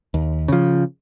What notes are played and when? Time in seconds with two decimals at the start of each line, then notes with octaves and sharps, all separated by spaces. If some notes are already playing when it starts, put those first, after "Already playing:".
0.14 D#2
0.48 C#3 F3